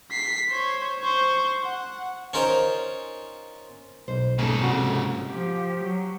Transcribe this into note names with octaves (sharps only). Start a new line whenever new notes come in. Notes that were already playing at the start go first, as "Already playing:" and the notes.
B6 C7
C5 C#5
C5 C#6
F#5
C#4 D#4 F4 A#4 C5
B1 C5
G#2 C#3 A#3 E4 A4
C3 F#4
F3 G4
F#3